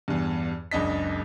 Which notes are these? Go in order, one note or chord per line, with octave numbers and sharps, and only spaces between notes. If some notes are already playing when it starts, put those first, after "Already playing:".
E2 G2
F#1 C#2 D4 D#5 B6